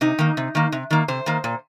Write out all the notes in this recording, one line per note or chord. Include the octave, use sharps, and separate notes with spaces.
C3 D#4
D#3 A#3
C3
D#3 A#3
C3
D#3 A#3
C3 C5
D#3 A#3
A#2